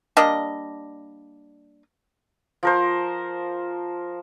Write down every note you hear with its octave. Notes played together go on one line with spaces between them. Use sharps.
G3 A#3 D4 D#5
F3 A#4 C5